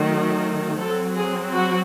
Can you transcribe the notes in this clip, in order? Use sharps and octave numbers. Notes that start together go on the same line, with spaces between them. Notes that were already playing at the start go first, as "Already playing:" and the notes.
Already playing: D#3 F#3 A3
F#3 C4 A4
G#4
F#4